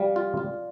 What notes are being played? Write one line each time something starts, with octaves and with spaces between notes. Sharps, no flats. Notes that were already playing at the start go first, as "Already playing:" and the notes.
Already playing: G3 D5 F5
F4
F4